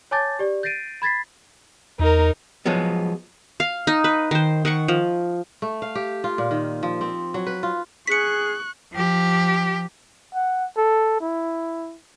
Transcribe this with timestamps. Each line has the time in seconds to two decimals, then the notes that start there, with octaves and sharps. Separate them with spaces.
0.11 C#5 G#5 A5 D6 G6 A6
0.39 G4 D5
0.63 G6 A6 A#6 C7 D7 D#7
1.02 B5 G#6 A6 B6 C7
2.00 E2 D#4 A#4
2.66 F3 F#3 G#3 B3
3.60 F5
3.87 D#4
4.04 B4
4.31 D#3 C5
4.65 D#3 F#5 C#6
4.88 F3
5.62 A3
5.82 F5
5.95 G4
6.24 F4
6.38 A#2
6.51 D#3
6.83 F3
7.01 C4
7.34 F#3
7.47 B4
7.63 F4
8.07 G#4 C#6 F#6 B6 C#7
8.92 F3 G4
10.35 F#5
10.77 A4
11.21 E4